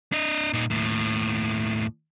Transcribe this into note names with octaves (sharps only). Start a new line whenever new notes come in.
D4 D#5
A#2 D#4
D#2 A2